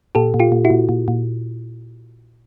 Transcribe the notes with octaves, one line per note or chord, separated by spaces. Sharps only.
A#2 G4 A4
A#2
F4 G4
A#2
E4 F#4
A#2
A#2
A#2